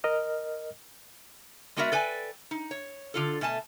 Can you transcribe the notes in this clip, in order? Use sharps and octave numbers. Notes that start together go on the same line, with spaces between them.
A#4 D#5 F6
G#3 B3 F#4 A#4 D5 E5
A4 B4 D5 G5 G#5
D#4
C#5
D3 F4 A4
B2 A3 G#5 A5